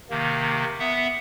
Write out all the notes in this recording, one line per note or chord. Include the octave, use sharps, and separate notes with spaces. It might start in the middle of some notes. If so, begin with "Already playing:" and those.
C3 D#3 A#3
B3 E5 F#5